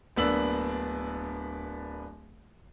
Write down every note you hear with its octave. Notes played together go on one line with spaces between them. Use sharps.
D1 A#3 B3 D4 E6 F#7